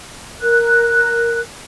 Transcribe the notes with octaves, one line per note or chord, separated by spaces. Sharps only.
A#4 F#6